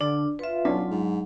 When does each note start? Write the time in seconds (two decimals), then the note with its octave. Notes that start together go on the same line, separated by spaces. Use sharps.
0.01 D3 D4 D5
0.39 F4 B4 E5
0.65 B1 F#3 C#4 D4
0.91 G#2